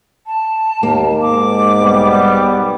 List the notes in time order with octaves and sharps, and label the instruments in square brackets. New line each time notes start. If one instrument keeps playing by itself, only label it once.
[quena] A5
[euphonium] D#2 [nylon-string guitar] A#3
[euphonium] G#2 [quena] D6
[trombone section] B1 G3 B3